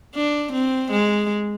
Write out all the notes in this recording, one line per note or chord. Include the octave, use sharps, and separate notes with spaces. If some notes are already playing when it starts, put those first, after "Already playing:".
D4
C4
G#3